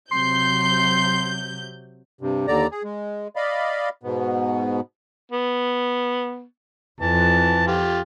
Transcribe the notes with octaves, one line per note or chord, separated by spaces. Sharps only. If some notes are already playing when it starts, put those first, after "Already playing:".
C3 F#3 C6 G6
G2 C3
D#2 D3 D5 A#5
G#4
G#3
D5 D#5 F5 B5
G#2 B2 B3
B3
F2 E3 A5
F4 G4